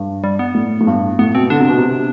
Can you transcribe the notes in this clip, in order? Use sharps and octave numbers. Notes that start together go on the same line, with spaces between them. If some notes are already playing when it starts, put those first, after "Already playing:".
Already playing: G2
G3
B3
A2
A2
G2
A2 B3
B2 C4
D3 D4
C3
B2
C3